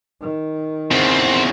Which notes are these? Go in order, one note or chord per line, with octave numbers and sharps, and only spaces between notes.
D#3
E2 C#3 C4